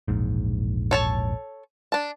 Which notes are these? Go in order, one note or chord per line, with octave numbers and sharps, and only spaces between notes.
E1 A#1 G#2
A4 C#5 A5
D4 A5